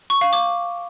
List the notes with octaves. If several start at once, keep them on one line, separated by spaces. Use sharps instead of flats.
C#6
F5
D6